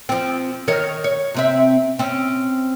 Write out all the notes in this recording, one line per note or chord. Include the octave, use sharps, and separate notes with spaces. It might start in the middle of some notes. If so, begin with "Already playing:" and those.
F3 C4
D#3 A#4 C#5
C#5
C3 C4 E5
C4 C#4